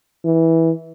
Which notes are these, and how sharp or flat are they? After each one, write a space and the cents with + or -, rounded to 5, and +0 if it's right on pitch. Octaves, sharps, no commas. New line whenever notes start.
E3 -15